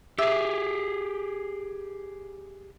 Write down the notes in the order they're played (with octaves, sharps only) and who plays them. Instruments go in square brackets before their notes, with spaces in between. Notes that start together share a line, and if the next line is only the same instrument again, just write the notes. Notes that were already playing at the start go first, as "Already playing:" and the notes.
[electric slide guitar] G4 G#4 [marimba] E5 E6